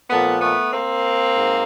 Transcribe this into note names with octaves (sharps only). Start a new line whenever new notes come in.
A#2 F3 A3 B3
A3 B3
A#3 C4
G#2